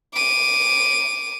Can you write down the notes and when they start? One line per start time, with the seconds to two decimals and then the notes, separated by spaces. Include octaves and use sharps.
0.14 D6 D#7